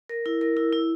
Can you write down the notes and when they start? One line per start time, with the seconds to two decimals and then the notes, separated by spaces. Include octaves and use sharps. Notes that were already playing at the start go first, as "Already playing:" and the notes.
0.09 A#4
0.26 E4
0.41 A#4
0.57 E4
0.73 E4